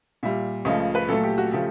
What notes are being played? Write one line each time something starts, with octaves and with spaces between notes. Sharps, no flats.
A#2 G3 E5
C#2 C#3 F3 A3 D#5
B4
A#2 F#3 A3 A4
G4
F#4
C#3 F3 A3 G4